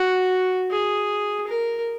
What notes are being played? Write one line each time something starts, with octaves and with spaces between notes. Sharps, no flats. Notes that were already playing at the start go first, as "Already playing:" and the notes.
Already playing: F#4
G#4
A#4